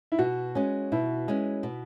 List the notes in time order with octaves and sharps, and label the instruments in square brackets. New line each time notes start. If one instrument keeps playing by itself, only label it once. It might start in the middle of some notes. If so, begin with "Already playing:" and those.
[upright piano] E4
[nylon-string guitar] B2 [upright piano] F#4
[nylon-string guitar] G#3 C#4
[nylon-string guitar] B2 [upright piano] E4
[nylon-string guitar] G#3 C#4
B2